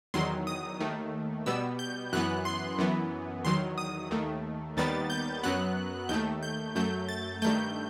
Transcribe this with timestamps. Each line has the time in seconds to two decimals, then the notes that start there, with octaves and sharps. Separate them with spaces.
0.14 E2 D#3 F#3 C6
0.47 D#6
0.80 D#2 D#3 A3
1.46 B2 G3 B3 E6
1.79 G6
2.13 F#2 E3 B3 F#6
2.45 C6
2.78 F#2 E3 B3
3.45 E2 D#3 F#3 C6
3.78 D#6
4.11 D#2 D#3 A3
4.77 D#2 D#3 G3 B3 A6
5.10 G6
5.43 F#2 F#3 B3 F#6
6.09 D#2 D#3 A3 G6
6.43 G6
6.75 F#2 F#3 A3 G6
7.09 A6
7.42 G2 D#3 A3 G6